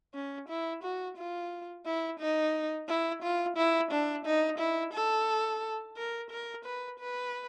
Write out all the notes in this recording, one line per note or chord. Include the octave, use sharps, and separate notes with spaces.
C#4
E4
F#4
F4
E4
D#4
E4
F4
E4
D4
D#4
E4
A4
A#4
A#4
B4
B4